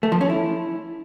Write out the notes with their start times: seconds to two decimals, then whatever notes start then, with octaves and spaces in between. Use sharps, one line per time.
0.03 A3
0.12 F3
0.21 C#4
0.30 E4